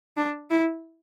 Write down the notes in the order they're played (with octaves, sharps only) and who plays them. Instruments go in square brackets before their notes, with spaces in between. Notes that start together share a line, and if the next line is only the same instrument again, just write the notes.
[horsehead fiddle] D4
E4